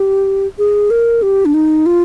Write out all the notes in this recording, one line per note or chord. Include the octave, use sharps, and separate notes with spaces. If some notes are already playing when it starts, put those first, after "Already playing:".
Already playing: G4
G#4
A#4
G4
D4
D#4
F4